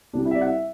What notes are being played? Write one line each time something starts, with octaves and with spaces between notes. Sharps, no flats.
C2 C3 G3 D4
E4
E5
D5
F#5
E5